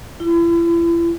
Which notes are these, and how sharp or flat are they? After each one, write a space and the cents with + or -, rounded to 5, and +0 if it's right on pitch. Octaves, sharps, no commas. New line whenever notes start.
E4 +40